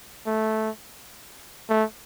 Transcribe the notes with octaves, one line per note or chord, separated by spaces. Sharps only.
A3
A3